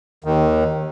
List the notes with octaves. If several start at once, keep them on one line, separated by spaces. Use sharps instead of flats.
D#2 D#3